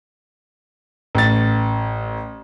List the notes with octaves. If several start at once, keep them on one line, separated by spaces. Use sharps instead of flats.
A1 A6